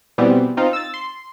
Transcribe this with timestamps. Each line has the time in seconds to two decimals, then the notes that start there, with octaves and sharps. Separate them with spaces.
0.18 B2 E3 G3 B3 C4
0.57 C4 D#4 F4
0.73 E6 A6
0.94 C6